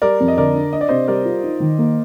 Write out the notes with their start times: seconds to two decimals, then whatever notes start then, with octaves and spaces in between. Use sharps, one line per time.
0.02 G3 A#4 D5
0.20 F2
0.28 D#5
0.37 D3 A#4 D5
0.55 D4
0.73 D4 D#5
0.81 D5
0.88 C3 C5 D#5
1.08 G3 A#4 D5
1.25 F4
1.44 D#4
1.60 D#3
1.78 A#3